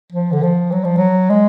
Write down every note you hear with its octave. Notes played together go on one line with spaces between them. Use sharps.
F3
D3
F3
F#3
F3
F#3
G#3